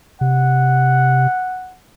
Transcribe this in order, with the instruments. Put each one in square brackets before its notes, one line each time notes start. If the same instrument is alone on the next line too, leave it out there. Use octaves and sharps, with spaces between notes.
[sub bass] C3 [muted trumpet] F#5